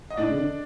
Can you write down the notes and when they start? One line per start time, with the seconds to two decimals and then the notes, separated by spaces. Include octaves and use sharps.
0.10 D#5
0.17 A2 D4 D5
0.30 C#3
0.37 D3